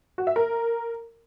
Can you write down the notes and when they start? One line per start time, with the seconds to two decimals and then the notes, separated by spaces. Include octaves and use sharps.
0.18 F#4
0.27 E5
0.36 A#4